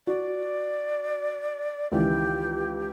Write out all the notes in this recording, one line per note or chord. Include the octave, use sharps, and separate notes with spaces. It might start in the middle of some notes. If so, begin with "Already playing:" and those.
F#4 D5
C#2 D#3 E3 G4